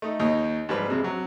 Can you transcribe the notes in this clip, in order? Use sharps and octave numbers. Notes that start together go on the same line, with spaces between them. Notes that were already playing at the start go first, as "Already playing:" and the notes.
A3 D#4
D#2 D#4 C#5 D#5
G#2 F3 G3 B4
F2 C3 G#3
C3 F#3